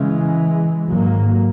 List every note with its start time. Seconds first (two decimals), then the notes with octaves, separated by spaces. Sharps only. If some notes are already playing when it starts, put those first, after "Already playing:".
Already playing: C#3 E3 G#3
0.88 G#1 G#2 F#3 A#3